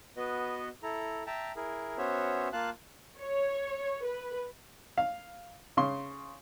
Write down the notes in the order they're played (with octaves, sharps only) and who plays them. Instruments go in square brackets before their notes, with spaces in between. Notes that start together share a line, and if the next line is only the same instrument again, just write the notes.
[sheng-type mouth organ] B3 F#4 B4 D#5
E4 A4 A#5
E5 G5 A5 A#5
E4 G#4 A#4
B3 C#4 F#4 C5 C#5 E5
A#3 F4 F5 A5 F#6
[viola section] C#5
B4
[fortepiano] F5
C#3 C6